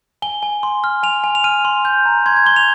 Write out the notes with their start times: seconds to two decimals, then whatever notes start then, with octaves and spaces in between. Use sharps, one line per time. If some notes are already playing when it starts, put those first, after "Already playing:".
0.22 G#5 G7
0.43 G#5
0.63 C6
0.84 F6
1.03 G#5 F7
1.24 G#5
1.35 F7
1.44 F6 D#7
1.65 C6
1.85 G6
2.05 A#5
2.26 C6 G#6
2.36 G#6
2.46 C6 G7
2.56 F7